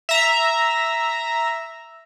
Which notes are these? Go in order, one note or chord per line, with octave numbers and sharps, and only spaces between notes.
E5 A#5